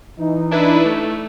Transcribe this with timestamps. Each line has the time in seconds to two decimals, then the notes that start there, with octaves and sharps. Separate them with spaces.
0.19 E3 D#4
0.51 D4 E4 B4
0.85 A3